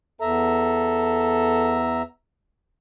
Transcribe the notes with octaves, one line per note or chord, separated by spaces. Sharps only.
E2 A4 E5 A#5